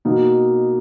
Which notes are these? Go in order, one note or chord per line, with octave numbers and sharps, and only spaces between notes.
B2 A#3 D#4